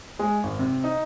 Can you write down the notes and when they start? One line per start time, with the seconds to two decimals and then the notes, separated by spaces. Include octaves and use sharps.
0.19 G#3
0.43 G#1
0.59 C3
0.84 D#4